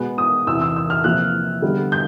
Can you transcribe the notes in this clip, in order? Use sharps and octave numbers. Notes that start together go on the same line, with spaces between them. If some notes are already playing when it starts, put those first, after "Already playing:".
Already playing: B2 G#3 B3
D#6
E2 C3 E3 E6
E6
E6
F6
C3 F3 A#3 F#6
D3 G3 B3
G6